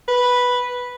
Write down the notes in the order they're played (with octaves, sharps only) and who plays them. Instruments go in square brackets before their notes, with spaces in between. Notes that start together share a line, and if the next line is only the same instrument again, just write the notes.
[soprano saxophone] B4